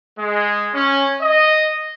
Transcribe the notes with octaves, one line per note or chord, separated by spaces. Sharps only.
G#3
C#4
D#5